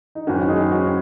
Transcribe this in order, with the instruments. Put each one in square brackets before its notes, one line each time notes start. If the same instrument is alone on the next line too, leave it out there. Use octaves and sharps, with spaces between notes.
[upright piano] D#4
F#1 F#2 D#3 C#4 F#4
D#4 G#4
C#4 F#4